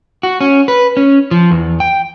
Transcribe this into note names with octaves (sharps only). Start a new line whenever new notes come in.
F#4
C#4
B4
C#4
F3
E2
G5